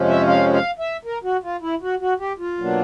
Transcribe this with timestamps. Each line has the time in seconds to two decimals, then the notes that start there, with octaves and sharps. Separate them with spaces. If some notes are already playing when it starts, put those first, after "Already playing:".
Already playing: F2 C3 F3 G#3 C#4
0.09 E5
0.27 F5
0.53 F5
0.79 E5
1.05 A#4
1.23 F#4
1.43 F4
1.62 E4
1.82 F#4
2.00 F#4
2.19 G4
2.39 F4
2.58 B2 F#3 A#3 D4